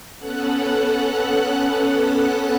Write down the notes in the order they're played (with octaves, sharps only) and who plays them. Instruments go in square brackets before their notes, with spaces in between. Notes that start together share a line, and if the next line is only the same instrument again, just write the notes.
[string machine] B3 C#4 A4 F#5 F#6